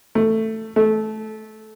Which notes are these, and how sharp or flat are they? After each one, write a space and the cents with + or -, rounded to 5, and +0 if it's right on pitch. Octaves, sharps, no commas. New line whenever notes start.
A3 +10
A3 -20